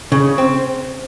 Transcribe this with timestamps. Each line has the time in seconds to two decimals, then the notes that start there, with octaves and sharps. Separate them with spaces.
0.12 C#3
0.38 C4